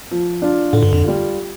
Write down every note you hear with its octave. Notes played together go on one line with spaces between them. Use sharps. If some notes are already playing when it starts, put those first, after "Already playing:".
F3
D4 F4
A2 D3
G2
F2
G3 F4